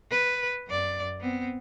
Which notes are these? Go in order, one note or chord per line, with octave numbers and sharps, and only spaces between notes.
B4
F#2 D5
B3 C4